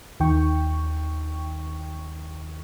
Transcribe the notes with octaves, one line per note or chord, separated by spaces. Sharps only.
D#2 D#3 G5 C#6